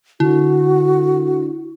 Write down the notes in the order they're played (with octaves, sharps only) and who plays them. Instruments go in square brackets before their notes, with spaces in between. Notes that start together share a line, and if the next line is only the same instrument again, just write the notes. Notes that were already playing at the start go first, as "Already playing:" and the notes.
[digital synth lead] D3 [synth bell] E4 [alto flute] F#4